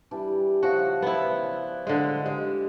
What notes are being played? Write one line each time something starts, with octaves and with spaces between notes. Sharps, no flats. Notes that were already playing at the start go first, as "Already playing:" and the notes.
E3 G3 D4
C#3 F3 F#4
B3 E4
D5
D3 G#3
G#3 G4